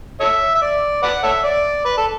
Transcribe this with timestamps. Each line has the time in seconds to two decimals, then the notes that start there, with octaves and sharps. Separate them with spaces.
0.20 A4 C#5 E5
0.55 E5
0.62 D5
1.03 B4 D5 F#5
1.23 A4 C#5 E5
1.44 D5
1.85 B4
1.98 A4